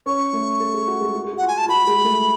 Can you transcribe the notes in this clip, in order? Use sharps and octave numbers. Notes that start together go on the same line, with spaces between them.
C#4 C#5 C#6
A3 A4
A4
G#4
F#4
G#3 G#4
F#4
G#4
F#4
F4 F#5
G#5
A5
F4
F#4 B5
G#3 G#4
A3 A4